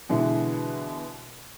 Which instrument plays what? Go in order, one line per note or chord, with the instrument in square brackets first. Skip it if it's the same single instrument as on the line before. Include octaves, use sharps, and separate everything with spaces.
[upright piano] B2 D3 E3 G#3 E4